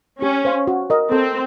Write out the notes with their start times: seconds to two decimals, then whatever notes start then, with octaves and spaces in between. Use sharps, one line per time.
0.22 C#4 G4
0.45 C5 F5
0.67 F#4
0.90 A#4 D#5
1.12 C4 A4